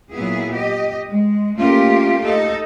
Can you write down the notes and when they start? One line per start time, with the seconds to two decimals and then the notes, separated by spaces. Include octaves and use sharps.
0.12 A#2 F#3 B3 E4 G#4
0.52 G4 D#5
1.09 G#3
1.57 A3 A#3 C#4 F4 G4 A#4
2.23 D#4 A4